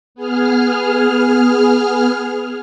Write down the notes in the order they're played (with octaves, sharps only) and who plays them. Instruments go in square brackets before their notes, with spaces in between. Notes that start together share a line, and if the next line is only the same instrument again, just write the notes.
[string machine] B3 G#4 F6